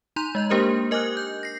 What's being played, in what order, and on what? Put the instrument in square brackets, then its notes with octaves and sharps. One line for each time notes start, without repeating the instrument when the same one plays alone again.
[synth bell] D#4 A#5 C6 G6 F7
G#3 D#5 G6
A#3 D4 G4 A#4 C5 D#5
A#4 D#5 G#5 D6 F6 F#6
G6
A#6 C7